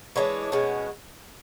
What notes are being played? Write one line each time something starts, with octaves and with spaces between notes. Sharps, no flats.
E3 G#3 D4 C#5
B2 G#3 C#4 F#4